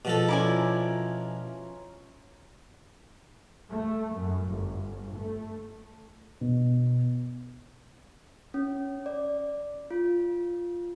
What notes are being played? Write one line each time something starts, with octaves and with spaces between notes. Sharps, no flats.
B2 F3 A4
C#4 E4 F4 D5 G#5 A#5
A3
F#2
G1
A3
B2
C#4
D5
F4